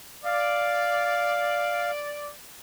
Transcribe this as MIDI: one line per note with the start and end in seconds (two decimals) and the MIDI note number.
0.25 2.33 74
0.25 1.91 77